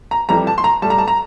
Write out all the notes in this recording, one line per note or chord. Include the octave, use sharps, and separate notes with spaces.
A#5
F2 E3 G3 A#5
A5
C6
A#5
A2 G3 A5
A#5
A5
A#5